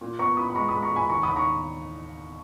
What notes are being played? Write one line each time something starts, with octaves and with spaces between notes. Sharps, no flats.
A#2
B3 A#5 C#6
A#2 B5 D#6
B5
G#3 A#5 C#6
G#3 B5 D#6
A#5 C#6
A#2
G#5 B5
D#2 A#5 C#6
D#2 B5 D#6
A#5 C#6